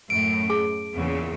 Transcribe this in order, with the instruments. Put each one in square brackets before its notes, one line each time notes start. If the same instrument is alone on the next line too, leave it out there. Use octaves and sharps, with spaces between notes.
[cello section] F#2 A2 [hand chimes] D7
[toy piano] G#4 A5 D6
[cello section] E2 A#2 C#3